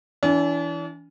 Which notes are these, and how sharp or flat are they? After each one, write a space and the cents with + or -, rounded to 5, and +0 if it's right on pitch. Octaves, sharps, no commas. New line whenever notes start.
E3 +0 D4 -45